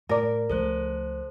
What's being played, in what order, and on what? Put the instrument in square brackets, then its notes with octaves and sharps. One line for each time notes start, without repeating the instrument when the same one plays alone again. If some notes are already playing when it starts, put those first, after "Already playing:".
[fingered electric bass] A2 A3 [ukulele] A#4 D5
[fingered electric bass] C#2 F3 A3 [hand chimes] A4 C5 F#6